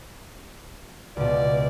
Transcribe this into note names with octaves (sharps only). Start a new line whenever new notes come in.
C#2 B2 D5